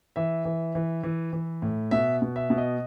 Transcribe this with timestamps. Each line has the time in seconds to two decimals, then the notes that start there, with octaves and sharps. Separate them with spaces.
0.16 E3 E5
0.45 E3
0.75 E3
1.03 E3
1.33 E3
1.62 A2
1.91 B2 E5
2.22 B2
2.36 E5
2.50 B2
2.58 D#5